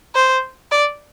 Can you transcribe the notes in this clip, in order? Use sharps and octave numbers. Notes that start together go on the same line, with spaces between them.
C5
D5